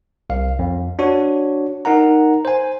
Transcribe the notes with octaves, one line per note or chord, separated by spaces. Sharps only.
C2 F5
F2
D4 F#4 C#5
D#4 A#4 F#5 A#5
C5 G#5